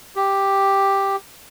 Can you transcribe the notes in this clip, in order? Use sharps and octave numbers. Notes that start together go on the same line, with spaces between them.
G4